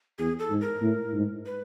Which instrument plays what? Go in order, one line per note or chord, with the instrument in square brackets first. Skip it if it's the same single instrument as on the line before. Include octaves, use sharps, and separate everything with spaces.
[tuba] E2 [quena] G#4
[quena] A4
[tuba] G#2
[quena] A#4
[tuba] A2
G#2
[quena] B4